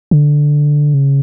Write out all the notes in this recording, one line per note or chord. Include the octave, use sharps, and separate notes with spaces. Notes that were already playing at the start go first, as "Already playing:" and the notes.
D3
C#3